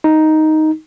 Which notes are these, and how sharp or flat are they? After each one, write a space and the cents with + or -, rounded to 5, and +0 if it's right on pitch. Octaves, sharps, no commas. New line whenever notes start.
D#4 +5